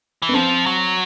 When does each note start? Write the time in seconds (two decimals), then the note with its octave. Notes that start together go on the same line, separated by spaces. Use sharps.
0.22 E3
0.29 B3
0.34 F3 C4
0.66 F#3